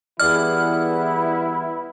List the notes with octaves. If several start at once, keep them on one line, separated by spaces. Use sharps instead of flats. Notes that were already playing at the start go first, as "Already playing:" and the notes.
E3 G3 B3 E4 G#4 D5 F6